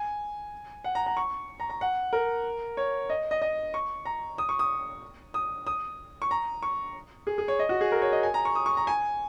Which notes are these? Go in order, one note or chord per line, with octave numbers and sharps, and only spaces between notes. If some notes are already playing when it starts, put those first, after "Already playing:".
Already playing: G#5
F#5
A#5
A#5
C#6
A#5
A#5
F#5
A#4
C#5
D#5
D#5
D#5
C#6
A#5
D#6
C#6
D#6
D#6
D#6
C#6
A#5
C#6
G#4
G#4
C#5
D#5
F#4
G#4
A#4
C#5
D#5
G#5
A#5
C#6
D#6
C#6
A#5
G#5